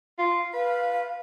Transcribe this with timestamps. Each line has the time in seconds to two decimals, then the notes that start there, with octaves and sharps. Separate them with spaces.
0.18 F4
0.53 B4 F5